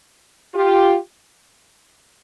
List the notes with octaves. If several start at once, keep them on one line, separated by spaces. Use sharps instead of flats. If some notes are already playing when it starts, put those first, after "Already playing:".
F4 G4